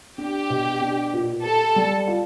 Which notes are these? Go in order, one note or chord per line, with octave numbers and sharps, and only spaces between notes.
D4 G4
B2
D4
A#2
G4 A4
G3
F4